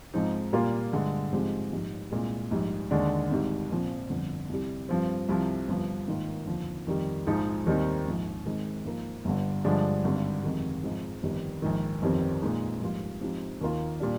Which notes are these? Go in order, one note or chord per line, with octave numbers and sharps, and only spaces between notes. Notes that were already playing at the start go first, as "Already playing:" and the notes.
G#2 F3 G#3 C4 D#4
A#2 G3 A#3 F4
G2 D3 G#3
G#2 F3 G#3 C4 G4
A#1 G#2 G3
C2 A#2 G#3
A#1 G#2 G3
D#2 D3 G#3 D4
G#1 G#2 G3
A#1 A#2 F3 C4
G1 F2 D3
C2 C3 G3
G2 F3 C4
C2 C3 F3
G1 G2 F3
G#2 D#3 A#3 F4
F1 D#2 D3 F3
F2 D#3 G3
A#1 G#2 F3 G#3 D#4
D#2 D#3 G3 C4 D#4
A#1 G#2 F3
G#2 D#3 G#3 C4
G#2 F3 A#3
G1 G2 D3
G2 D3 F3 G#3 D4
G#1 G2 D3 G3
F2 C3 D#3 G#3
G#2 F3 G#3 C4 D#4
G1 F2 D#3 G3
A#1 G#2 D#3
G1 F2 D#3 G3 C4
A#2 G#3 D#4
A#1 G#2 G3 A#3 F4
G#2 F3 C4 D#4 G4
D#2 D#3 A#3 F4
A#2 G3 D4